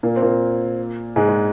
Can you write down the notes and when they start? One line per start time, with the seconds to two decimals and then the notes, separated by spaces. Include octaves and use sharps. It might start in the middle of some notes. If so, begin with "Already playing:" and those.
0.03 A#2 A#3
0.16 C4
0.22 A#2 A#3
1.16 G#2 G#3
1.29 G#3